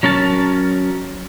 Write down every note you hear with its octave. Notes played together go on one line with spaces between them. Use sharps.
F#3 C#4 A#4 A5